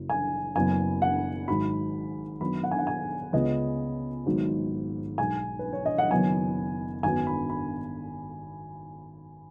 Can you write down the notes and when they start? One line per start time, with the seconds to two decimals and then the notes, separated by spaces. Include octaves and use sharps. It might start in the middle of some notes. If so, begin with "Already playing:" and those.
Already playing: F#1 F#2 F#3
0.09 G#5
0.56 F#1 F#2 F#3 B3 G#5
1.02 F#5
1.47 G#1 G#2 F#3 B5
2.41 F#2 D#3 F#3 B3 B5
2.64 F#5
2.71 G#5
2.78 F#5
2.87 G#5
3.33 C#2 C#3 B3 D#5
4.26 G#1 G#2 F#3 B3
5.18 B1 B2 G#3 G#5
5.59 B4
5.73 C#5
5.86 D#5
5.98 F#5
6.11 F#1 F#2 D#3 B3 G#5
7.03 G#1 F#2 F#3 B3 G#5
7.27 B5
7.50 B5